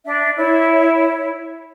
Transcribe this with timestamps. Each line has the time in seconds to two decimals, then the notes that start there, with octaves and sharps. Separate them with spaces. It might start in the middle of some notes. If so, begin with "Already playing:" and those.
0.05 D4 E5
0.37 E4 C#5